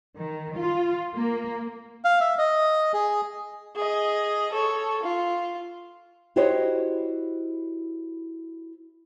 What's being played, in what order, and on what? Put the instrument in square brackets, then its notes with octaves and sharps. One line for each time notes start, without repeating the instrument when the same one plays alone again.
[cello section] D#3
F4
A#3
[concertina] F5
E5
D#5
G#4
[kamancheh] G#4 D#5
A4 C#5
F4
[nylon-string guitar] E4 F#4 G4 C5 C#5 D#5